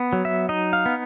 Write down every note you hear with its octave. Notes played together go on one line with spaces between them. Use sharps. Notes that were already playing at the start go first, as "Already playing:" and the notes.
Already playing: B3
F#3
E5
D#4 D#5
F5
B3